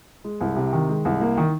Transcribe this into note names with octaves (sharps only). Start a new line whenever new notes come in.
G#3
C2
C3
D#3
G#3
C2
A#3
D#3